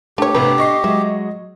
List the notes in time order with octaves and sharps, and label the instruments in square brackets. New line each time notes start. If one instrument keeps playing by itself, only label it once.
[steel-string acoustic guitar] A3 [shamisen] D4 C#5 [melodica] G4
[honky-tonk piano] G#1 C3 [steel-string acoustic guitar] D4 [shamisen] B4
[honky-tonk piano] D#5 C#6 C7
[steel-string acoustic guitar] F#3 G#3 [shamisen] E5